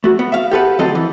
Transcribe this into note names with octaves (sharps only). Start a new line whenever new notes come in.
A3 F#4
B3
E5 F5
G4 A4 B4 F#5
D2 F#3 C4 F4 A4 D#5
E3